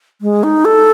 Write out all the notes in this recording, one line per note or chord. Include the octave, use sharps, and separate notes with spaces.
G#3
D#4
A4